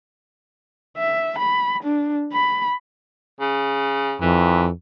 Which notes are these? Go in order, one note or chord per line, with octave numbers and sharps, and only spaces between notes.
E5
B5
D4
B5
C#3
F2 E3